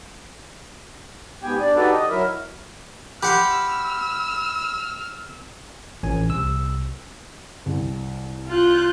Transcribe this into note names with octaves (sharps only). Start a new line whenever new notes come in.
G#2 B3 G4 G5 G#5
D4 D5
D#4 F#4 G4 A4 B4 D5
D#5
F#3 E4 A#4 E5
G4 F#5 B5 C6 E6 F6
A1 E3 C#4 G#5
C2 C3 E6
C2
F4 F#6 G6